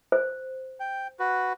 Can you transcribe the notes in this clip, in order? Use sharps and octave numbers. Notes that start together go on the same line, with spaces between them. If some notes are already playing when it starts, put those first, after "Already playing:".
C5
G5
F#4 B4